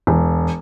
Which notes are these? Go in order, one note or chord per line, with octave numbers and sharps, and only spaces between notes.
E1